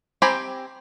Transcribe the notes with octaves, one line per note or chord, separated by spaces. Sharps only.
C4 G4 G#5 A#5 B5